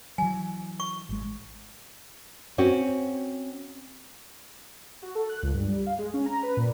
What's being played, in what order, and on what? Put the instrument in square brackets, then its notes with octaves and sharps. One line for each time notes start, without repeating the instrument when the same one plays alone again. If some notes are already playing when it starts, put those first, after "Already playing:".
[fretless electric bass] E3 F#3 [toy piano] G#5
[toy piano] C#6
[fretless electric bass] G#1 G#3
[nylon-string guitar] C4 C#4 F#4
[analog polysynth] F#4
A4
F#6
C#2
G2
G3
F5
G#3
C#4
A#5
B4
A#2